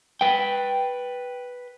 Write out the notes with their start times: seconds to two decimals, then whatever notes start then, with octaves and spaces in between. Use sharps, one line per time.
0.21 B4 G5